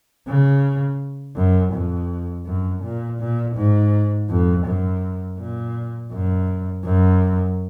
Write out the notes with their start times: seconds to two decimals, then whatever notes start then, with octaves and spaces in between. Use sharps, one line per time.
0.27 C#3
1.36 F#2
1.73 F2
2.46 F#2
2.83 A#2
3.19 A#2
3.56 G#2
4.29 F2
4.65 F#2
5.38 A#2
6.12 F#2
6.85 F#2